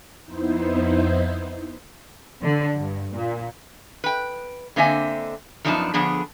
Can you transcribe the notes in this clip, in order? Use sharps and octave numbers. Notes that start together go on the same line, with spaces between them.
F2 B3 D#4 E4 C5
D3
G2
A#2
B4 G5
D3 A#3 C4 D#5 E5 G#5
F#2 F3 B3 D4 D#4 A5
D3 F3 B3 D4 G#4